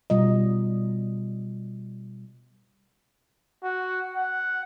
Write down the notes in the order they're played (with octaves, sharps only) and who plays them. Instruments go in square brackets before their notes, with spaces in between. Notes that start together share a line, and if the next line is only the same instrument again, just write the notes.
[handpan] B2 G3 F4 D#5
[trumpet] F#4
F#5